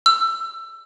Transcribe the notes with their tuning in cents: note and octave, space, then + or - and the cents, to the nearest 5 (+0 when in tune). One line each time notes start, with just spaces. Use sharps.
E6 +20